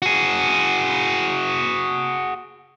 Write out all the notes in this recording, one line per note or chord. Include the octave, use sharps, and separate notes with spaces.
F#4 G#4